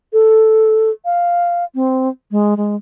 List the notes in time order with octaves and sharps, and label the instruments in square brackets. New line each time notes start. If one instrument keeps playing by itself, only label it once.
[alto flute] A4
F5
C4
G#3
G#3